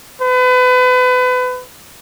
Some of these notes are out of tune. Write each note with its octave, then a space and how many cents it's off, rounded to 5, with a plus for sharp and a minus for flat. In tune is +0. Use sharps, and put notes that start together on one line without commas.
B4 +30